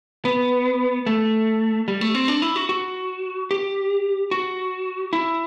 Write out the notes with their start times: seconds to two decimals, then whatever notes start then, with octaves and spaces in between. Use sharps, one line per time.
0.25 B3
1.06 A3
1.88 G3
2.01 A3
2.15 C4
2.28 D4
2.42 E4
2.56 F#4
2.69 F#4
3.51 G4
4.31 F#4
5.13 E4